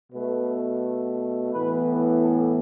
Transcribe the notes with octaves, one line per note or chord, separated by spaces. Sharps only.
B2 A3 B4
A2 E3 B3 B4
A4